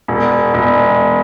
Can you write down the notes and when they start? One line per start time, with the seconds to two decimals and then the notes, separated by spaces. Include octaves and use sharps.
0.08 E1
0.54 E1